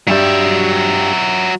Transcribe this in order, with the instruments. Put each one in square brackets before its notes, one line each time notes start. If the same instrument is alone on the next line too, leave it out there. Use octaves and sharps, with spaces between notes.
[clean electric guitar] G2 G3 [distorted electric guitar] F#3 E5